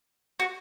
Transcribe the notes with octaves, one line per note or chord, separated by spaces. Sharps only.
F#4